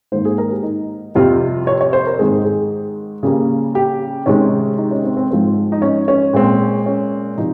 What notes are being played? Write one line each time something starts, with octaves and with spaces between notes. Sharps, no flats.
G#2 D#3 A#3 C5
G#4
A#4
G4
D#4
F2 C3 G3 C4 F4
C#5
C#5
C5
A#4
G#2 D#3 G#3 C4 G#4
G#4
C#3 G3 A#3 G#4
G4
C3 D#3 G#3 C4 C#4
D#4
C#4
C4
C4
G#2 F3 G#3 C4
D#4
C#4
C#4
A#2 G#3 C4
C#4
C3 F3 D#4